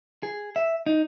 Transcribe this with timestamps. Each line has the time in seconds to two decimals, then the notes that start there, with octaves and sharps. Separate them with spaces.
0.23 G#4
0.56 E5
0.86 D#4